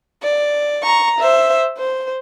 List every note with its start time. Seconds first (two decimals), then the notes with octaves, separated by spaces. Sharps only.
0.22 D5
0.83 A#5 C#6
1.18 C5 E5
1.78 C5